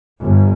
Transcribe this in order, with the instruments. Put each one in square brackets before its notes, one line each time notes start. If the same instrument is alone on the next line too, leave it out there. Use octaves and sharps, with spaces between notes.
[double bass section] G1